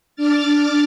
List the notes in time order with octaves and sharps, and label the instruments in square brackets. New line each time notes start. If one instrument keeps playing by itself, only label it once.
[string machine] D4 D6 F6 A6